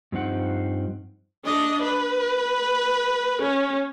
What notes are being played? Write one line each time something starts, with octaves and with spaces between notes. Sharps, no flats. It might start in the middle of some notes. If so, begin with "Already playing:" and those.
G2 F3 C4 D#4 F#5
D4 D#5
B4
C#4